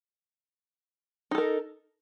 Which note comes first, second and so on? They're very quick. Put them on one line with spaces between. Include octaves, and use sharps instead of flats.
D#4 A4 A#4